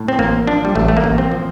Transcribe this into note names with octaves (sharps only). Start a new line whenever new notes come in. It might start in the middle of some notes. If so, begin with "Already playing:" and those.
Already playing: A2
C4
A1 A#3
F3 D4
G3
A1 A3
A3
A#3
A1
C4
F3